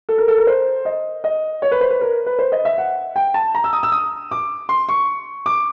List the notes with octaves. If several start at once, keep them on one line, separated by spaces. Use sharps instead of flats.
A4
A#4
A4
A#4
C5
D#5
D#5
C#5
B4
C5
B4
A#4
B4
C5
D#5
E5
F#5
G5
A5
A#5
E6
D#6
E6
D#6
D6
C6
C#6
D6